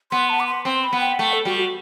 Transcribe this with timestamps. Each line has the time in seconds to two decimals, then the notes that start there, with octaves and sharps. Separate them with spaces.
0.11 B3 C6
0.29 A5
0.40 D6
0.47 C6
0.65 C4 C6
0.84 B5
0.93 B3
1.01 G5
1.19 A3 G5
1.33 A4
1.45 G3 F#4
1.59 F#4